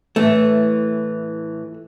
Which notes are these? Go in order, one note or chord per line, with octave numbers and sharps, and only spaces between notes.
A2 E3 A3